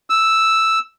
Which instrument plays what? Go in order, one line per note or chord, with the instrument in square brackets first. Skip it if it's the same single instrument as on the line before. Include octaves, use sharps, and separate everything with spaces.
[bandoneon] E6